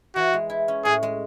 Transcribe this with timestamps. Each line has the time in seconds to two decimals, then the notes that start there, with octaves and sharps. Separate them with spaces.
0.16 E3 F#4
0.34 G#3
0.50 E4
0.68 C#4
0.84 A2 G#4
1.03 G#3